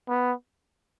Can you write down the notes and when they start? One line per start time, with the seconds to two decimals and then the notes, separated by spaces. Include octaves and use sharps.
0.09 B3